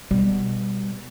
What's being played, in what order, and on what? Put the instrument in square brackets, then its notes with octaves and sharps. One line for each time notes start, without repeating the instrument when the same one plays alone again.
[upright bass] B2 [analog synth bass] G3